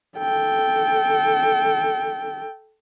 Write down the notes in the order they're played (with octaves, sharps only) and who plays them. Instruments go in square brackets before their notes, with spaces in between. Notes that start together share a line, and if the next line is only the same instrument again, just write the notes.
[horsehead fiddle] A4 G5